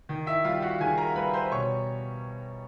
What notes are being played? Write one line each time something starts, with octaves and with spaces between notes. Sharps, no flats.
D#3
E4 E5
G3 F4 F5
F#4 F#5
D#3 G#4 G#5
A#4 A#5
G3 B4 B5
C5 C6
B2 C#5 C#6